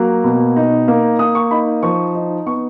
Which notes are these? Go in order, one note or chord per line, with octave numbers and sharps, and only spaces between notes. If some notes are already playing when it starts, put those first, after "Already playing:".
Already playing: F#3 A#3
B2
D#4
A#3
A#3 D#6
C#6
D#4 B5
F3 C#6
D#4
B3 C#6